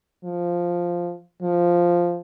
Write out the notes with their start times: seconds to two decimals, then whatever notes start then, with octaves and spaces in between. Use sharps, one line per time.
0.24 F3
1.42 F3